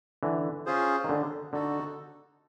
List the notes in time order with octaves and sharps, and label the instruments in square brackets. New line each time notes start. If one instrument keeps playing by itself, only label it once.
[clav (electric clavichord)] D3 E3
[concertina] C#4 F4 G#4 C5
[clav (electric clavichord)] D#3
D3
[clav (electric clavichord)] D3 [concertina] D#4 F#4 A4